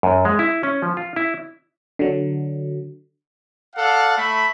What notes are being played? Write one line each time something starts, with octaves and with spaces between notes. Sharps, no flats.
F#2
G#3
E4
C#4
F3
F4
E4
D3 F#3
A4 D5 F5 F#5
A3 E5 B5